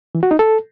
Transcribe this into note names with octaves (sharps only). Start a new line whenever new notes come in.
E3
F#4
D#4
A4